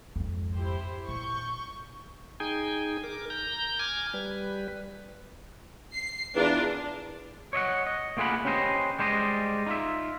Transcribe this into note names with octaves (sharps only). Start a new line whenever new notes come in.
F2 G#2
E4 G4 C5
A#2 C#6 G6
D#4 G#4 G5 G#5
A#4 D6
A#5 G6
G#5 D6 F6 G#6
G3 B4
C7
E2 D4 F4 A#4
C#5 D#5 E5 F#5
D#5
A3 A#3 F4 G#4 F#5 B5
C#4 G4 B4 C5 D#5
G3 G#3 C5 D5 D#5
D#4 F4 E5